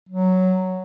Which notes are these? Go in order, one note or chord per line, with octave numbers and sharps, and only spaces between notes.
F#3